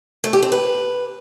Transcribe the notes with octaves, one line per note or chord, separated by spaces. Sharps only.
A3
G4
C4
B4